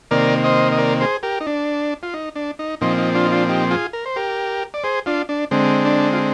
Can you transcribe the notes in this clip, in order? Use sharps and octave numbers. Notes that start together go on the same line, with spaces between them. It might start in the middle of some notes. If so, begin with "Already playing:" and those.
C3 D#3 A#3 A#4 D5
C5 D#5
D#5
A#4 D5
G#4 C5
G4 A#4
D#4
D4
F4
D#4
D4
D#4
A#2 F3 C4 D#4
D#4
D4 F4
D#4
D4 F4
D#4 G4
F4 G#4
A#4
C5
G4 A#4
D5
G#4 C5
D4 F4
D4
D3 G#3 C4
D4
F4